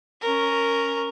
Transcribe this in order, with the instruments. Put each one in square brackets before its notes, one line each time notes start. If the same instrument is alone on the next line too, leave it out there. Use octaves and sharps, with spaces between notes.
[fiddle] C#4 A#4